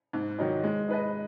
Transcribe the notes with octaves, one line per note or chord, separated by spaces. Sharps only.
G#2
D#3 F#3 D#4
G#3
D#4 B4 D#5